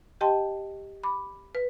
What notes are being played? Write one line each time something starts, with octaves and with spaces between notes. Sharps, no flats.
G4 D#5 G5 A5 C6
B5 D6
B4